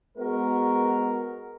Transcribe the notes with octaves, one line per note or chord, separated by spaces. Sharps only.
G#3 B3 F#4 A#4